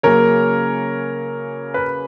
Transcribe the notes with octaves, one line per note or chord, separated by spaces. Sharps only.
C#3 F#3 A#3 C#4 A#4 C#5
B4